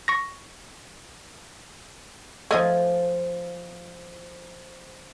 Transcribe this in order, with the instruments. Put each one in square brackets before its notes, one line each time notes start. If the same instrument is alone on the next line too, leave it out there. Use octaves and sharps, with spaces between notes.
[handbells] C#6 A#6
[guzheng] F3 G#5 [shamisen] A3 D#5